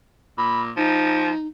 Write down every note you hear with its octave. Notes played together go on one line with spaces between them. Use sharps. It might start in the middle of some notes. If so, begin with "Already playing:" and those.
A#2 B5
F3 D#4